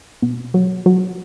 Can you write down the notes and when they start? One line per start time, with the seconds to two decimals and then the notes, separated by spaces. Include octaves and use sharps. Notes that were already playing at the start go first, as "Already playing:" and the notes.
0.22 B2
0.54 F#3
0.86 F#3